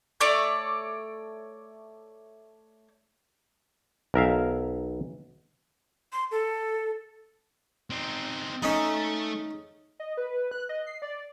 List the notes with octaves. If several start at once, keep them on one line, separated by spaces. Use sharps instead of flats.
A3 C#5 D5
B1 A#4 E5 F5
C6
A4
C4 D#4
A3 C#4 D#4
D#5
B4
F#6
D#5
C7
D5